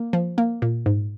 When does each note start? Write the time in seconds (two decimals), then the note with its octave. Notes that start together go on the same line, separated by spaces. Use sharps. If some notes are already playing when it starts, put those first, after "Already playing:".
Already playing: A#3
0.13 F3
0.38 A#3
0.62 A#2
0.86 G#2